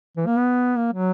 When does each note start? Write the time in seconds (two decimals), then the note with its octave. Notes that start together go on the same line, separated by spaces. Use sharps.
0.17 E3
0.27 A#3
0.37 B3
0.77 A#3
0.92 F#3